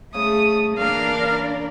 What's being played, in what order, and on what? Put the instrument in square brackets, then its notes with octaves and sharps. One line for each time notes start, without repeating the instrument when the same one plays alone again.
[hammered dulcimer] C#3 [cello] A3 [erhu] D#6
[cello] E3 A#3 [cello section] D4 A#4 D5 [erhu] F5